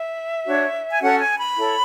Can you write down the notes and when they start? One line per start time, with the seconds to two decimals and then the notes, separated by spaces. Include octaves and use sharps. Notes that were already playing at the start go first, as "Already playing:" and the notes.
Already playing: E5
0.46 D4 F#4 C#5
0.91 G#5
1.01 C#4 F#4 A4 C#5 F#5
1.19 G#5
1.38 B5
1.56 E4 A4 C#5